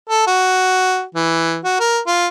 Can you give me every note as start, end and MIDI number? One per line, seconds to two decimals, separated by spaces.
0.10 0.24 69
0.27 1.04 66
1.15 1.59 52
1.64 1.80 66
1.80 2.00 70
2.07 2.27 65